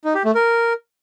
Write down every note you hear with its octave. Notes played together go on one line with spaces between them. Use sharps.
D#4
G4
A3
A#4